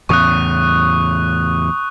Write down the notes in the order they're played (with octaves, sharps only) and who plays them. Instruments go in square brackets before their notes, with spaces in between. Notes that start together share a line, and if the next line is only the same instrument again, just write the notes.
[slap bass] E2 A2 C#3 [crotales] C#6 D#6 F#6